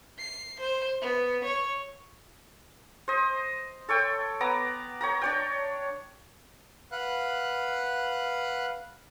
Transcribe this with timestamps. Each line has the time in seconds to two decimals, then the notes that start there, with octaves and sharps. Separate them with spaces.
0.19 C7
0.60 C5
1.02 B3
1.44 C#5
3.08 C5 D#5
3.89 A4 C#5 G5
4.40 B3 A#5 D6
5.01 C#5 G5 A#5
5.22 D4 C#5 G5
6.92 B4 F5 F#5 F#6